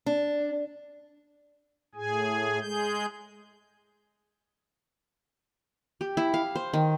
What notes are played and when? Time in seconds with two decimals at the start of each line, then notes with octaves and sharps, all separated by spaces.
0.06 D4
1.95 A2 G#4 G#5
2.60 G#3 G#4 G6
6.01 G4
6.17 E4
6.34 F5
6.55 C5
6.73 D#3